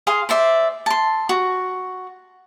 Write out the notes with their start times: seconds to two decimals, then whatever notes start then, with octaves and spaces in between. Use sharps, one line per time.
0.07 G#4 F5 C6
0.29 C5 D5 E5
0.86 A5 C6
1.29 F#4